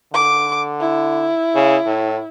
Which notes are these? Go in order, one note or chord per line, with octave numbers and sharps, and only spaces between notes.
D3 D6
E4
C#3
A2